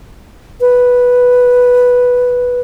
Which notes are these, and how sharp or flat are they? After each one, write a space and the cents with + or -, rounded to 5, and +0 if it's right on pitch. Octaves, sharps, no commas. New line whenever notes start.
B4 -5